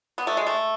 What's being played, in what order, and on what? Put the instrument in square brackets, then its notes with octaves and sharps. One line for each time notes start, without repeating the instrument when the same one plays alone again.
[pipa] B3
A3
G#3
A3